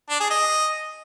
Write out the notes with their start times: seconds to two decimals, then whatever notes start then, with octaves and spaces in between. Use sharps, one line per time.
0.10 D4
0.20 G#4
0.30 D#5